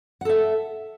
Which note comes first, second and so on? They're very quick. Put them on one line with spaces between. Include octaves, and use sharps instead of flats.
F#5 A4 E5